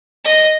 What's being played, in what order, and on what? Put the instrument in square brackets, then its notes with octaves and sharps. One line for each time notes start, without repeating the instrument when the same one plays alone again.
[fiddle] D#5